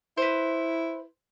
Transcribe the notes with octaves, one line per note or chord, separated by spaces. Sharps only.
E4 B4 C5